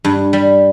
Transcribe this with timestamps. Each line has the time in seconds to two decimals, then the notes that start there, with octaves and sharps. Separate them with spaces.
0.05 G2
0.33 G3